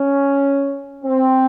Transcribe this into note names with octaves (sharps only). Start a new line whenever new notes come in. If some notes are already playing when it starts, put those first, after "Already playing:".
Already playing: C#4
C4